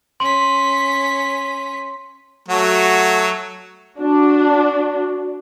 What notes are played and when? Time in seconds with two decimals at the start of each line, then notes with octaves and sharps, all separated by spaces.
0.20 C#4 C6 B6
2.48 F#3 A3 F#4
3.99 D4 F#4